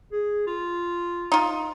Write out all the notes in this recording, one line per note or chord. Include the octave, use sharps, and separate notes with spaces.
G#4
F4
D#4 F4